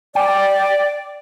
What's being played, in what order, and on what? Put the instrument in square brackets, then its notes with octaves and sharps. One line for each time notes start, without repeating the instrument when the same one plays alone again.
[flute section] D5 [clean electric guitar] G5